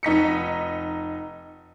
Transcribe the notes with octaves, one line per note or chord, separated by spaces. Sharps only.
F1 D#4 B6 C#7